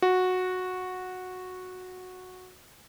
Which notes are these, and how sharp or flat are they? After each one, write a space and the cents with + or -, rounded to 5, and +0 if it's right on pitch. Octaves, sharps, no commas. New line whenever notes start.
F#4 -10